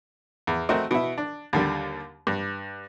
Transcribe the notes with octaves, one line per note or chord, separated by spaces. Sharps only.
E2
A3 C4 F#4 A#4 D#5
B2 E4
D4
D#2 D3 G3
G2